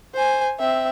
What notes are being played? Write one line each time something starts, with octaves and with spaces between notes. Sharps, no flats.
C5 G#5
C4 E5